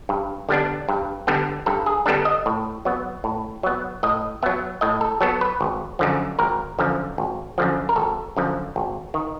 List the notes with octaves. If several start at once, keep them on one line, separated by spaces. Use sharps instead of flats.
G2
D3 G3 B3 D4
G2
D3 G3 B3 D4
G2 A4
G#4
D3 G3 B3 D4 A4
D#5
A2
F#3 B3
A2
F#3 B3
A2 D#5
F#3 B3 E5
A2 D#5
A4
F#3 B3 A4
B4
G#1
F#2 D3 F3
G#1 A#4
F#2 D3 F3
G#1
F#2 D3 F3
A#4
G#1 A4
F#2 D3 F3
G#1
D#3